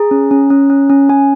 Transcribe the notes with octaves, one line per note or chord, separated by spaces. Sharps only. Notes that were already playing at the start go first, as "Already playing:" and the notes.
Already playing: G#4 A#5
C#4
C#4
C#4
C#4
C#4
C#4 G#5